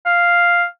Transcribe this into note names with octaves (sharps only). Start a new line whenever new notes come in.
F5